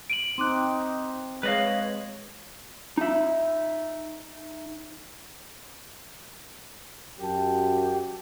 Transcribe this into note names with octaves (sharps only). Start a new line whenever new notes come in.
D7 D#7 F#7
C4 D#4 C6 D6 F#6
G#3 B4 C#5 D#5 F5 F#7
D#4 E5
F#2 F#4 G4 A5